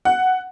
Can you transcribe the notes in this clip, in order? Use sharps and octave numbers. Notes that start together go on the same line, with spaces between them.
F#5